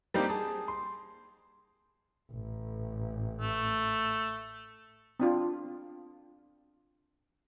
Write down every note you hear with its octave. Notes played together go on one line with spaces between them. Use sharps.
G3 A#3 C4 D4 D#4 G4
G#4 A5
C6
A1
A3
C4 D4 F4